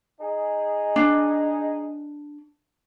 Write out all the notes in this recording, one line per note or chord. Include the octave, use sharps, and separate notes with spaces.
D#4 G#4
D4